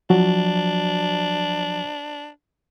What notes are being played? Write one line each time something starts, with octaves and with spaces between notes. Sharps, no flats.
F3 F#3 D4 F#4